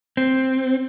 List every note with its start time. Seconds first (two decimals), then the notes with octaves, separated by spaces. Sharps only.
0.17 C4